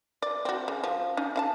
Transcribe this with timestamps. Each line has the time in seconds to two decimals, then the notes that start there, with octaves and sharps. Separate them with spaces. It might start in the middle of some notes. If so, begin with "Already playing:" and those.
0.22 D5
0.45 C4 F#4
0.68 C#3
0.84 F3
1.17 C#4 D#4
1.36 C#4 F5 A5